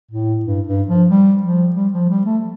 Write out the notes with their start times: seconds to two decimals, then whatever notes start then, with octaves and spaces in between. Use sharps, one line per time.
0.12 A2
0.45 G2
0.67 G2
0.88 F3
1.11 G3
1.43 F3
1.76 G3
1.93 F3
2.10 G3
2.26 A3